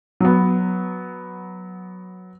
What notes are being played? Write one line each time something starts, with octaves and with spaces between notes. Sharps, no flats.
F#3 B3